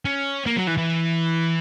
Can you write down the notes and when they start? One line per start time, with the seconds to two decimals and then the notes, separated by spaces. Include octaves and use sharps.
0.05 C#4
0.46 A#3
0.57 F#3
0.67 E3
0.77 E3